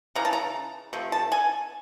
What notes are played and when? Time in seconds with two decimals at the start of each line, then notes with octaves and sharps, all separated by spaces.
0.15 C#3 E3 A#5
0.25 A5
0.33 A#5
0.93 C3 F3 A3
1.12 A5
1.32 G#5